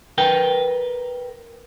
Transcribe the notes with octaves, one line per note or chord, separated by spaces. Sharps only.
A#4 B4 G5